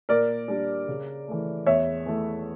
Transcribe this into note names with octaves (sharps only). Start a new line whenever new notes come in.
A#2 A#4 D5
G3 D4
C#3
E3 A3
E2 C#5 E5
E3 A3